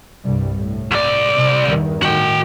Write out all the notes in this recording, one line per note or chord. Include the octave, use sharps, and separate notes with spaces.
C2 G2 G3
A2
C2 D5
C3
E2 G2 D#3
A2 D#3 F#4 G5